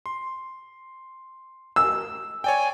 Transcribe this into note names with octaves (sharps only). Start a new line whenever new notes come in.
C6
E6
C#5 D5 G5 G#5